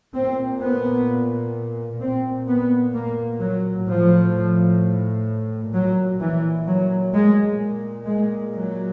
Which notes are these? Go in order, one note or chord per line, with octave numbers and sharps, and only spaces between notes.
A#2 C4
B3
A#2 C4
B3
A#3
F#3
A2 F3
A#2 F#3
E3
F#3
G#3
A#2
G#3
F#3